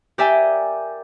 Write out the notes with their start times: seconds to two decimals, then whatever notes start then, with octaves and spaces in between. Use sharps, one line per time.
0.18 G4 A#4 D5 E5 G5 G#5